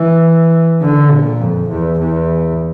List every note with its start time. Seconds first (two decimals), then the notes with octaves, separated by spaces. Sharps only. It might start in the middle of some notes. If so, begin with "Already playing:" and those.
Already playing: E3
0.82 D3
1.11 A#2
1.40 F2
1.69 E2
1.99 E2